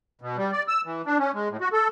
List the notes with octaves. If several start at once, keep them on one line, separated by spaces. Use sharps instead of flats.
B2
G3
D5
E6
E3
D4
C#4
G#3
A2
F#4
A4